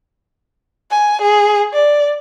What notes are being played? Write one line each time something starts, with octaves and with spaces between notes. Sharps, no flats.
G#5
G#4
D5